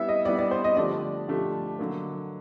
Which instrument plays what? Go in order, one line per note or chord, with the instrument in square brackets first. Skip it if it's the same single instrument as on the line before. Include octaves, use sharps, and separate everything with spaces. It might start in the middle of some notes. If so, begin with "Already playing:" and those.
Already playing: [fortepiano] G3 B3 E4 [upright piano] E5
[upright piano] D#5
[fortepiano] G3 B3 E4 [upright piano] D5
[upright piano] D5
C5
D#5
[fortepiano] D3 F3 A3 D4 G4 [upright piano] D5
[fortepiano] D3 F3 A3 D4 G4
D3 F#3 A#3